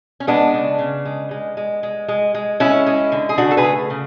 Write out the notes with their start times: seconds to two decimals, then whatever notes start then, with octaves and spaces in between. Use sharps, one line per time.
0.20 C#4
0.27 G#3 B3 D4
0.54 C#3
0.79 C#3
1.05 G#3
1.31 G#3
1.57 G#3
1.83 G#3
2.08 G#3
2.34 G#3
2.60 G#3 C#4 E4
2.86 G#3
3.12 D3
3.29 G#4
3.38 C#3 D4 F#4
3.51 A4
3.57 G#4 B4
3.64 A3
3.90 C#3